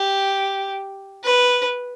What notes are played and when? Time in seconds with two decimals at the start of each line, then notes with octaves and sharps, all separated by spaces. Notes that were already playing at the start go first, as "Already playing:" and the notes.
Already playing: G4
1.24 B4